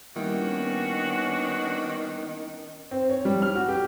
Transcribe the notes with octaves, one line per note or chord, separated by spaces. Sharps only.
D#3 G3 A#3 B3 C#4 D4 E4 F#4
C4
C#5
G3
F6
F#4
G4